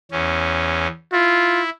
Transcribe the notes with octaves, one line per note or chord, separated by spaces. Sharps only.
E2 C#4
E4 F4